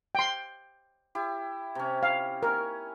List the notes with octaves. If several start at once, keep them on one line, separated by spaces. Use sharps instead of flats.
G5 C6
E4 G4
C3 C#4
F5
C#4 A#4 G#5